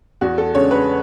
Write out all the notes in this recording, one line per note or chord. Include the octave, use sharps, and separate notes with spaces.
E2 F#4
A4
C#3 G#3 D4 C#5
B4